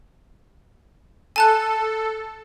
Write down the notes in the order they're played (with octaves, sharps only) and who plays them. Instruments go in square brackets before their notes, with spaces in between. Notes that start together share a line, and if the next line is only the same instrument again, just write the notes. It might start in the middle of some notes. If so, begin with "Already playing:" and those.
[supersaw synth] A4 [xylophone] G#5 A5 F#6